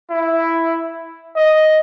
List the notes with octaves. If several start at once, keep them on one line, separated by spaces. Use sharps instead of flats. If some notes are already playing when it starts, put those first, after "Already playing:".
E4
D#5